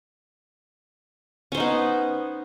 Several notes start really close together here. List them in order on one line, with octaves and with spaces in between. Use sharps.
C#4 C5 D#4 B3